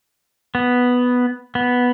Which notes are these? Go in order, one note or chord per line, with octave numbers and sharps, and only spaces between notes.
B3
B3